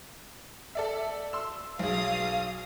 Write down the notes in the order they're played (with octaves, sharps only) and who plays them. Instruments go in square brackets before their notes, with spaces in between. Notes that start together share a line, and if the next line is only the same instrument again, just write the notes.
[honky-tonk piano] A4 D5 E5
C6 E6
[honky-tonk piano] B1 G#4 [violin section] F5 D#6